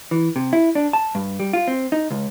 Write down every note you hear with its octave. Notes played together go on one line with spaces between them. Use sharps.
E3
C3
E4
D4
A5
G2
G3
F4
C4
D#4
C#2